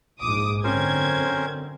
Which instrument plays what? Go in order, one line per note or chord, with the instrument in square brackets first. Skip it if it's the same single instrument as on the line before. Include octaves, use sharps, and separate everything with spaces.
[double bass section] A#1 G#2 [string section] D6 D#6
[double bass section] F#2 D3 [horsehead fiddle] C4 [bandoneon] C#4 A#4 C5 [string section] G#6